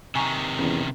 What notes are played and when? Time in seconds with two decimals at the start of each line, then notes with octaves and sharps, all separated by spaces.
0.15 C3 D#3 G#5 A#5 C#6
0.59 E2 C#4